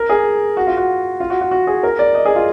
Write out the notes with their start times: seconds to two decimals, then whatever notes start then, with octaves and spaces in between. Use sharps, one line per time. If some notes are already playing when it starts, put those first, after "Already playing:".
Already playing: A#4
0.10 G#4
0.57 F#4
0.67 F4
0.77 F#4
1.20 F4
1.30 F#4
1.41 F#4
1.51 F#4
1.67 G#4
1.83 A#4
1.99 D5
2.15 D#5
2.25 G#4
2.36 F4